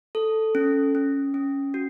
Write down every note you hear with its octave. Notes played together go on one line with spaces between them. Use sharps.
A4
C#4
C#4
C#4
F#4